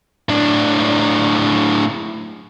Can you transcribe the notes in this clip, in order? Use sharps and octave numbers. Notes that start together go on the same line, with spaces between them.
A2 D4